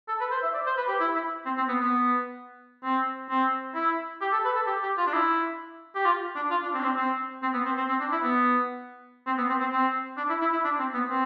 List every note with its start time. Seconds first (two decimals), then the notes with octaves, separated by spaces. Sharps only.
0.08 A4
0.20 B4
0.31 C5
0.43 E5
0.54 D5
0.66 C5
0.77 B4
0.88 G4
1.00 E4
1.15 E4
1.46 C4
1.57 C4
1.68 B3
1.81 B3
2.84 C4
3.30 C4
3.75 E4
4.21 G4
4.32 A4
4.45 B4
4.56 A4
4.67 G4
4.83 G4
4.98 F4
5.07 D4
5.13 E4
5.95 G4
6.06 F4
6.36 D4
6.51 F4
6.63 D4
6.74 C4
6.80 D4
6.85 C4
6.97 C4
7.43 C4
7.54 B3
7.65 C4
7.77 C4
7.89 C4
8.00 D4
8.12 E4
8.23 B3
9.27 C4
9.38 B3
9.49 C4
9.60 C4
9.73 C4
10.17 D4
10.29 E4
10.41 E4
10.52 E4
10.64 D4
10.79 C4
10.94 B3
11.10 C4